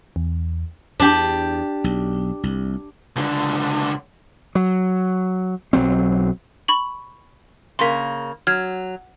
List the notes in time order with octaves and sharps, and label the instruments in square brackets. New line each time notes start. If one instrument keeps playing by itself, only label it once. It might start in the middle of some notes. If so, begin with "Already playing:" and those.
[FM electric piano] E2
[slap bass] E2 [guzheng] D4 G4
[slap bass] B1
C2
[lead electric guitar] C#2 D3
[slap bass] F#3
B1 F#3 C4
[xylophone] B5 C#6 F#7
[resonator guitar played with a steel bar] C#3 A#3 [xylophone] C6 B6
[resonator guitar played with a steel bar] F#3 [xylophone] F6 G#6